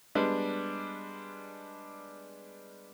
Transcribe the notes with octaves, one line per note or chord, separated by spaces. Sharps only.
G3 G#3 B3 D4